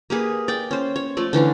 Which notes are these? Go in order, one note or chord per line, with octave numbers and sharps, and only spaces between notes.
A#3 G4 G#4 B4
D5 G5
C#4 C5
C#5
F3 A3 D5
D3 E3 C#4 D4